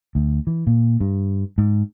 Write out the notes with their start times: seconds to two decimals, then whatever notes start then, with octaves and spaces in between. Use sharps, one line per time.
0.15 D2
0.47 E3
0.67 A#2
1.00 G2
1.58 G#2